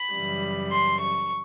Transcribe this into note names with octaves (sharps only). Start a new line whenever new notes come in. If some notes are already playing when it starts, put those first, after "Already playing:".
Already playing: B5
F#2 C#3 E3 G3
C6
C#6